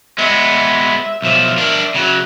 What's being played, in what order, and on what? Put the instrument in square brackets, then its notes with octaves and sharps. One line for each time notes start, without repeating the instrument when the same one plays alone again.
[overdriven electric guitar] G#3 B3 [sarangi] E5
[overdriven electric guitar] B1 F3
D4 A#4
C#3 F#3